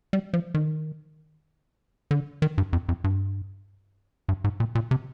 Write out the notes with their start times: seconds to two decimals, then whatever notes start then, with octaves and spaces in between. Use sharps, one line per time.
0.13 G3
0.33 F3
0.54 D#3
2.11 D3
2.42 D#3
2.58 G2
2.73 F2
2.88 F2
3.04 G2
4.28 G2
4.44 G#2
4.60 A#2
4.75 A#2
4.91 C3